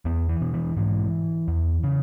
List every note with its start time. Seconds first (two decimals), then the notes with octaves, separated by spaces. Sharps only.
0.05 E2 B3
0.29 E3
0.41 B2
0.54 E3
0.77 G#2 E3
1.48 E2
1.83 C#3